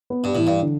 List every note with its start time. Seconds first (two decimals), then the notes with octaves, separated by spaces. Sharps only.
0.10 B3
0.24 G2
0.35 A2 E3
0.47 G2
0.62 D3